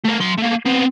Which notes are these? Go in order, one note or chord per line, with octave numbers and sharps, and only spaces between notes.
A3 A#4
F#3 C6
A3 A#3
B3 C4